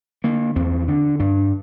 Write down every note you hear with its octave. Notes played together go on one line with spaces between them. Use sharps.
D3 A#3
E2 C4
D3 D4
G2 D4